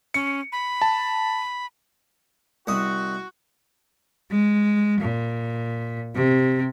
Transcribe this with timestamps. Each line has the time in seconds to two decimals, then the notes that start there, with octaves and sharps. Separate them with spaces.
0.14 C#4 C#7
0.52 B5
0.82 A5
2.67 C2 F#4 D#5
4.31 G#3
5.01 A#2
6.15 C3